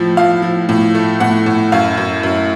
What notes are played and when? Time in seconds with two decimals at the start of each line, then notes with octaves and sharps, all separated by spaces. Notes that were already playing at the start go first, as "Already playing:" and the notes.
Already playing: A2 F3
0.17 F3 F5
0.42 F3
0.69 A2
0.95 A3
1.20 A2 F#5
1.46 A2
1.72 F#2 F5
1.98 F#2
2.23 F#2